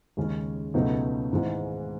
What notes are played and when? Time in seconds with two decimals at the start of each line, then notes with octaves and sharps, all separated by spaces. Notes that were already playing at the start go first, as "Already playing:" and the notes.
0.17 D#2 C#3 G#3 C#4
0.74 C#2 B2 F#3 A3 D#4
1.31 G#1 G#2 E3 G#3